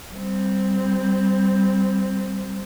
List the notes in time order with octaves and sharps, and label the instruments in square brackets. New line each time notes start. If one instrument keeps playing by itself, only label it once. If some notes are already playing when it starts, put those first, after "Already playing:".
[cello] G3 C4